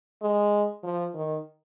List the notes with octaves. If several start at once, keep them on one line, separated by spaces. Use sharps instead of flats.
G#3
F3
D#3